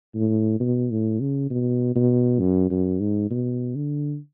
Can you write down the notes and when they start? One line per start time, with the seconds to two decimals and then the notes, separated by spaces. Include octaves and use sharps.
0.15 A2
0.60 B2
0.91 A2
1.21 C#3
1.50 B2
1.96 B2
2.40 F#2
2.70 F#2
3.00 G#2
3.31 B2
3.76 D3